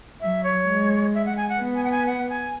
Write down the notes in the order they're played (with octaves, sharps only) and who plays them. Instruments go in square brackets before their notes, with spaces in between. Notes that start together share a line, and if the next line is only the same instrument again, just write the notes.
[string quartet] F#3 [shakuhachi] E5
[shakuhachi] C#5
[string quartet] G#3
[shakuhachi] E5
F#5
G#5
F#5
[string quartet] B3
[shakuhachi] G#5
F#5
G#5
F#5
G#5